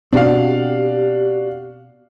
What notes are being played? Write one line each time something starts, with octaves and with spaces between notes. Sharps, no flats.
B2 C4 D4 F#4 G4 F5